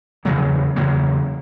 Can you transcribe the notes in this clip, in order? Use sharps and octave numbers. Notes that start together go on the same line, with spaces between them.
E2 C#3 F#3 A#3
E2 C#3 F#3 A#3